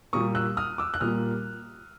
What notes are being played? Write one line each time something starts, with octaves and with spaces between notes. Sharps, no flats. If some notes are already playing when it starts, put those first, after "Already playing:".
A#2 G3 A#3 C#6 D#6
E6 F#6
D#6 F6
D6 E6
F#6
A#2 G3 A#3 D#6 F6